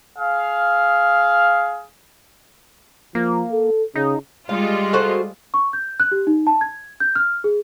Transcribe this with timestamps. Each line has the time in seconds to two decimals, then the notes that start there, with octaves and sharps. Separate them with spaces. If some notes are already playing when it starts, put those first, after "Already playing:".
0.17 G#4 F5
3.15 F3 A#3
3.52 A4
3.96 C#3 D#4
4.49 G3 G#3 F4 F5
4.93 A3 F#4 C5
5.54 C#6
5.73 G6
6.00 F#6
6.12 G4
6.27 D#4
6.47 A5
6.61 G#6
7.00 G6
7.15 F6
7.44 G#4